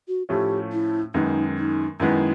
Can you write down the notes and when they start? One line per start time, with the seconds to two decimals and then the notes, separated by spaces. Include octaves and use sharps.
0.08 F#4
0.29 A2 F3 A3 C#4 F4 G4
0.72 E4
1.14 F#2 D#3 G#3 B3 D#4
1.58 D#4
2.00 F#2 D#3 G#3 B3 E4